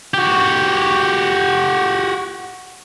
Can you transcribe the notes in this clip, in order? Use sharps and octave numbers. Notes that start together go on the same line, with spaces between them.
F#4 G4